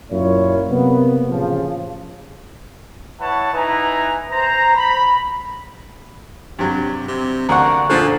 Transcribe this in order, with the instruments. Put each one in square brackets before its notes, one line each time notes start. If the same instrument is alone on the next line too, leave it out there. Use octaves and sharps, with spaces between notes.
[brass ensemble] F#2 A#2 E4 F4 C#5
C3 A#3 B3
A1 C#3 F3
[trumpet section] E4 B4 C#5 F#5 A5
D#4 E4 B4 G#5 A#5
C5 A#5
B5
[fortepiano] G2 F#3 [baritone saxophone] C3
[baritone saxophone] C3
[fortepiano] D2 F#5 [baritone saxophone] A#3 [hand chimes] A#5 C#6
[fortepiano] A#2 D3 F#6 [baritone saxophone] F3 [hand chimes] A4 A6